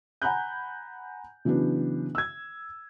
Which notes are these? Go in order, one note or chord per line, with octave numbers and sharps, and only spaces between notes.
F#5 G#5 A#5 B5 F#6 G6
C#3 E3 F#3 B3 D4
E6 G#6